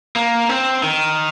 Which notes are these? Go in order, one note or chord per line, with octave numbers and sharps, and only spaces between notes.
A#3
C4
D#3